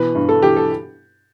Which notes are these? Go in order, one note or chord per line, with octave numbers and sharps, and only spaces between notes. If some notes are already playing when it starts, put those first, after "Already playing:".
Already playing: B2 E3 B4
G2
A4
E3 G4
A4